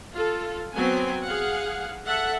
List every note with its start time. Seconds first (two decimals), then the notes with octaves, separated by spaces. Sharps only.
0.14 F4 A4
0.74 F#3 B3 C4 G#5
1.24 G#4 F5 F#5
2.07 A4 E5 F#5